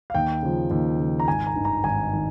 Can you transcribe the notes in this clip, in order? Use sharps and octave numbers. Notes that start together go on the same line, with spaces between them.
F5
D#2 G5
C#3 F3
D#2
C#3 F3
A#5
G#1 G#5
A#5
G2 D#3
A#5
G#1 G#5
D#3